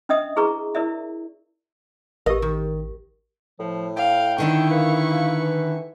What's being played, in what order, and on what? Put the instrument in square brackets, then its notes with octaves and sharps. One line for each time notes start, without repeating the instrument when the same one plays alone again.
[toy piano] C#4 D4 D#5 E5 D#6
E4 G#4 B4 A#5 C#6
E4 A#4 D5 E5
[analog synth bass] A1 [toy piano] G4 A#4 [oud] D#5
[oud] D#3
[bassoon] A2 [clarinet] F3
[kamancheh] F5 [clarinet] G5
[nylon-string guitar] D3 D#3 D4 [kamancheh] E4 C#6
[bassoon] A#3 [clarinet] B4
[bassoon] F4
E3